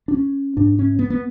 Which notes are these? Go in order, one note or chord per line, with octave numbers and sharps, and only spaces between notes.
D4
C#4
G#2 D4
C#4
B3
B3